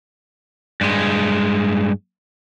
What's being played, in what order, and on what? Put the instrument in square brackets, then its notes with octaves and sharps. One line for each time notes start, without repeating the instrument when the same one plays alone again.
[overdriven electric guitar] G2 G#3